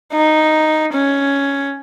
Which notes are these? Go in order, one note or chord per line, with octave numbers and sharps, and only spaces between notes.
D#4
C#4